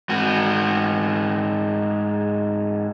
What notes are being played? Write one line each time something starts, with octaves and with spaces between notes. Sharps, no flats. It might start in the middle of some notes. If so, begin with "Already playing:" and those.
G#2 F#4